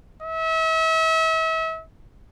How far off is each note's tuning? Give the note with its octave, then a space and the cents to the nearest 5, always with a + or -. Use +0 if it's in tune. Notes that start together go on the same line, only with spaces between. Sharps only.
E5 -35